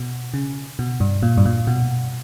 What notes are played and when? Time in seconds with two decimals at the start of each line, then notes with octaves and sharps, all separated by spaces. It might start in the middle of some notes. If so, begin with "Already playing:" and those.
Already playing: B2
0.34 C#3
0.79 B2
1.00 G2
1.23 A#2
1.37 G2
1.45 A#2
1.67 B2